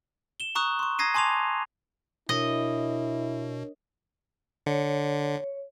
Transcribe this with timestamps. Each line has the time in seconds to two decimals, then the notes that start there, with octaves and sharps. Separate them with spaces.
0.40 E7 G7
0.55 A#5 C#6 D#6 F#6
0.79 C6 C#6
0.99 A#5 D#6 G#6 A#6 C7 D#7
1.14 G#5 A5 C6 D6 G#6 F7
2.29 B2 D4 E4 A#4 C#5 D#5
4.66 D3 C#5